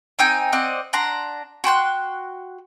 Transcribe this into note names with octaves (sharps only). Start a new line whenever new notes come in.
C4 D#4 G5 G#5
C4 D5 D#5 F#5
D4 F#5 A#5 C6
F#4 G5 C6 F#6